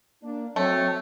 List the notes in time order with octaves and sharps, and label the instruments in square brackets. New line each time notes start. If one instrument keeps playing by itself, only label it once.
[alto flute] A#3 [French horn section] D4
[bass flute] F#3 [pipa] A3 [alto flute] C4 [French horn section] C#5